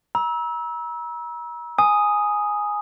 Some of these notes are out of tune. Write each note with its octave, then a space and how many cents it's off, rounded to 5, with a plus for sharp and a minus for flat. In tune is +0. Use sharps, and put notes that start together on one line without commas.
A#5 +40 E6 -20
G#5 +0 D#6 +0